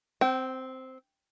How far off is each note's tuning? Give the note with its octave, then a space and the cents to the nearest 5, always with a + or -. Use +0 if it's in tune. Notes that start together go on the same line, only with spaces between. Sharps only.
C4 -5 G5 -35